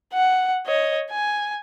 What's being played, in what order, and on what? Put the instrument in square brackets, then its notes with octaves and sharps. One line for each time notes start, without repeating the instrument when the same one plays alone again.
[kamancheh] F#5
C#5 D#5
G#5